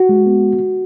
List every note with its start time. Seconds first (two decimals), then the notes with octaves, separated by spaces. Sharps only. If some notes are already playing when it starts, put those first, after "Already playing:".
Already playing: F#4
0.09 G#3
0.26 B3